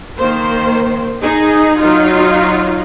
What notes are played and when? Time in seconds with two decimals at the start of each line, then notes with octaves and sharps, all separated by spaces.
0.17 D#3 A#3 C5
1.22 D#4 G#4
1.80 F#3 D#4 F4